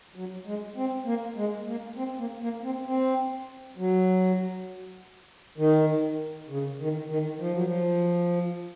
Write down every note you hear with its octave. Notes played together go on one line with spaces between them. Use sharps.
F#3
G#3
C4
A#3
G#3
A#3
C4
A#3
A#3
C4
C4
F#3
D#3
C#3
D#3
D#3
F3
F#3
F3